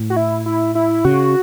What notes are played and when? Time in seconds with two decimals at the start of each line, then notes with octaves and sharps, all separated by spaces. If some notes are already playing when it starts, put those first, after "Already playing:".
Already playing: A2
0.10 F#4
0.16 E4
0.46 E4
0.75 E4
1.05 C#3 F#4